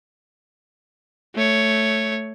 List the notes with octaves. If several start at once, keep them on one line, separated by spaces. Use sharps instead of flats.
A3 C#5